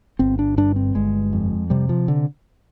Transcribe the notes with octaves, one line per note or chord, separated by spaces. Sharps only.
G1 C4
D4
G2 D4
C4
G1 G#3
F2
C3 G3
F3
D3